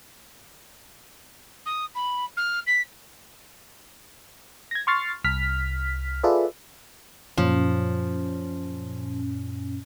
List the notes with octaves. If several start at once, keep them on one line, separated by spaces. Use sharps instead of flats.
D#6
B5
F6
B6
G#6 A#6
C6 C#6 F6 A6 C7
C2 F6 B6
F4 G#4 A4 B4 D5 E5
F#2 A#2 F3 C#4